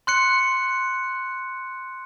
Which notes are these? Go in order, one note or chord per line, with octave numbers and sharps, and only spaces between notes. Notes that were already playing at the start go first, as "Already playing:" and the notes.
C6 F#6 C#7